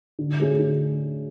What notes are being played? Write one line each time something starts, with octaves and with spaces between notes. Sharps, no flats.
D3
A3 C#4 G#4
D3